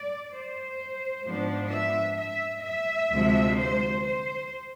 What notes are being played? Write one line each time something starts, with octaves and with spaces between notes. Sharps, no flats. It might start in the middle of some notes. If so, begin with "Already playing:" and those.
Already playing: D5
C5
G#2 F3 B3 D4
E5
E5
E5
D2 C3 F3 G#3
C5
C5